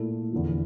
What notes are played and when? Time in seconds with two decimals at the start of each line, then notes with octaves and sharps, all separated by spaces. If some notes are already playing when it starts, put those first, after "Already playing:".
Already playing: A#2 A3 E4
0.32 E2 D3 F3